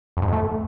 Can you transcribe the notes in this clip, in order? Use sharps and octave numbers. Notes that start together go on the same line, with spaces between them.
F2
G#2
F2
A3